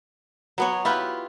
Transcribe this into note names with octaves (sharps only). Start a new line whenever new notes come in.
F#3 B3 C#5
E4 F4 G4 B4